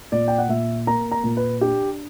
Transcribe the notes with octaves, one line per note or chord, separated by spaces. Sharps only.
A#2 D5
G5
F#5
A#2 E5
A#3 A#5
A#5
A#2
B4
D4 G4